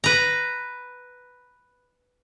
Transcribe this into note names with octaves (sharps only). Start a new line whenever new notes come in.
B4 A#5